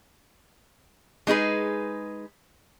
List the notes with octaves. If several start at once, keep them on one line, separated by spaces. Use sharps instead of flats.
G#3 D#4 G#4 B4